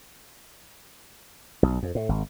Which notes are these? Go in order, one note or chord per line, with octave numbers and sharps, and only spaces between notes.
B1
F2
A2
G#1